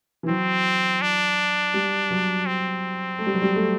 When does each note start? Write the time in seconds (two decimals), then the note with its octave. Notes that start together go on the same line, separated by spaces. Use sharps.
0.23 E3
0.28 F#3 C4
1.01 D4
1.74 G3
2.11 F#3
2.46 C4
3.19 A3
3.26 G3
3.34 F#3
3.42 G3
3.56 A3